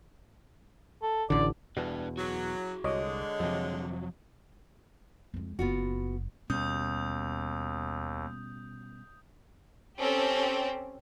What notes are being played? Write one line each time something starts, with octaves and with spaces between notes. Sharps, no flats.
A4
A1 D3 D5
E2 B2 D4 B4
F#3 F#4 G#4
C2 D3 G#3 C#5 D#5 D6
F2 C3 F3 F#3
F2 G#3
F#1 F#2 B3 F4 F#4
D#2 B2 G3 C#4 D#6 G6
C4 C#4 G4 A4